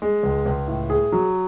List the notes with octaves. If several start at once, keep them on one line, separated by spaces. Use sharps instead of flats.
G#3
C#2
C#2
A2
G#4
F#3